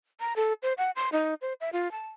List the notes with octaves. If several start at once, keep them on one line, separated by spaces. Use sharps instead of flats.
A#5
A4
C5
F#5
C6
D#4
C5
E5
F4
A5